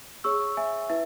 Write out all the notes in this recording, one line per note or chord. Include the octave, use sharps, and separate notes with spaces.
G#4 C#5 C#6 E6
E5 G#5
E4 B4 E5